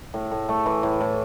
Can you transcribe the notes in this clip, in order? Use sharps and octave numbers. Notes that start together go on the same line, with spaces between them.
A2
A2
A3
E3
A2
A2